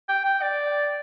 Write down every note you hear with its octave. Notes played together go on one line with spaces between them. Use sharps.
G5
G5
D5